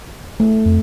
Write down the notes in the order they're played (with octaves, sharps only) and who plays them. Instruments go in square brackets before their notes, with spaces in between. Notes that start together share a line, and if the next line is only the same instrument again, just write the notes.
[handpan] A3
[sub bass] F2